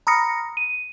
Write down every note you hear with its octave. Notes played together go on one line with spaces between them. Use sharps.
A#5 B5 D#6 F6 A#6 C#7
D#7